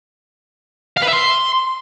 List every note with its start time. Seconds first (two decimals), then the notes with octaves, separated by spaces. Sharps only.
0.97 F5
1.03 B4
1.08 E5
1.13 C6